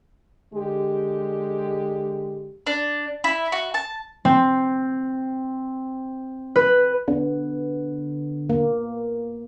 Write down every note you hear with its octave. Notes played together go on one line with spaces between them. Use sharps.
D3 G#3 G4
D4
E4
F#4
A5
C4
B4
D3 B3
A#3